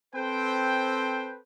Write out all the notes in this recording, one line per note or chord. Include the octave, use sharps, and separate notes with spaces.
C4 A4 B4 C5 G5